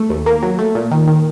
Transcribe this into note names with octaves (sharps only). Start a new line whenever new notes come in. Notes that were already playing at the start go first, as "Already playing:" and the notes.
Already playing: A3
D#2
A#3
F#3
A3
A#2
D#3
D#3